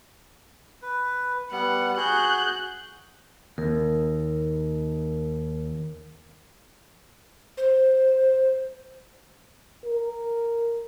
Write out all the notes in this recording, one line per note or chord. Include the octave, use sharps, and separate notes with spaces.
B4
G3 B3 F#5
F#4 G#4 F#6 G6
D#2 A#4
C5
A#4